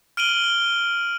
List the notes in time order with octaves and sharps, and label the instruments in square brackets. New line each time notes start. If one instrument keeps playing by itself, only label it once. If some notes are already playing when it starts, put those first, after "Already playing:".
[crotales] F6 D7 D#7 F#7 G7